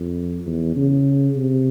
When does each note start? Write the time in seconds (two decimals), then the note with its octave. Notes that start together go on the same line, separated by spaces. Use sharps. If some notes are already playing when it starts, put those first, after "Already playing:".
Already playing: F2
0.46 E2
0.76 C#3
1.37 C3